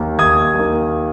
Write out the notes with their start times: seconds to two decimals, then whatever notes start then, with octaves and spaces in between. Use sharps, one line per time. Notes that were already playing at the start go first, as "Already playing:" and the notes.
Already playing: D#2 D#3 A#3
0.19 D#2 D#6 G#6
0.55 D#3 A#3